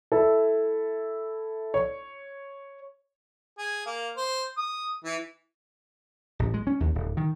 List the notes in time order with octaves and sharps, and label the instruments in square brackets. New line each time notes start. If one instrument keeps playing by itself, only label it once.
[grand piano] E4 A4
C#5
[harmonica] G#4
A#3
C5
D#6
E3
[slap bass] A1
G#3
C#4
D#2
D1
D#3